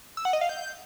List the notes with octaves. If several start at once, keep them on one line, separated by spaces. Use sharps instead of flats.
E6
F#5
D#5
F5
G6